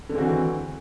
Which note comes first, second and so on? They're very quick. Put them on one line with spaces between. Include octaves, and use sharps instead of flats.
D3 G#3 C4 F#4 E3